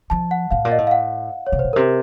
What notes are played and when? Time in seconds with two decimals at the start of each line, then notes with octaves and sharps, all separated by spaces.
0.10 F3 A5
0.31 F#5
0.51 A2 F5
0.65 A#2
0.72 D#5
0.78 A2
0.87 F5
0.91 F#5
1.47 C#5
1.52 C3
1.59 C5
1.64 A#2
1.73 C3 A#4